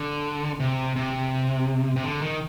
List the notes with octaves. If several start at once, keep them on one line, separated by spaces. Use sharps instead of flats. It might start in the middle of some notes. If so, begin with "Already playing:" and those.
Already playing: D3
C3
C3
C3
D3
D#3